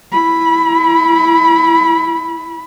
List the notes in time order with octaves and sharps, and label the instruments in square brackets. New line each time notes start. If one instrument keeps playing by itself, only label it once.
[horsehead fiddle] E4 B5